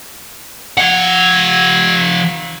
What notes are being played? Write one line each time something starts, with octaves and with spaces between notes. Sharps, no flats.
F3 F#5